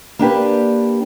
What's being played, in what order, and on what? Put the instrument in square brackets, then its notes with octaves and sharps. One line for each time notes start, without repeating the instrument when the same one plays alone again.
[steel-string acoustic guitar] A#3 D4 G4 B4